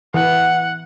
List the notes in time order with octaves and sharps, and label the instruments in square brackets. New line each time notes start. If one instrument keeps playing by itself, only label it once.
[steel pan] E3 [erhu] F#5